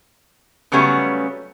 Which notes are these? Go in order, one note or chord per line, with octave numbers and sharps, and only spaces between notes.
C#3 F#3 G3 A3 B3 C#4